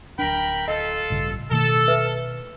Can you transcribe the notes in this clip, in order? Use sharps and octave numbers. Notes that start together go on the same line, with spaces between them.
D1 D4 A#4 G5 B5
F4 A4 D#5
A1 G2 C#3
B2 D#3 A3 A4
B4 E5